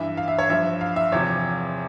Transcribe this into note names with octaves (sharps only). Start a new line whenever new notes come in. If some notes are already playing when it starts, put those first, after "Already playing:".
Already playing: G2 E3 E5
F5
E5
C#5
G2 F3 E5
F5
E5
E2 C3 F3 C#5